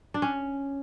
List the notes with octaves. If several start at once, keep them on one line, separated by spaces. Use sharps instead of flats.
D4
C#4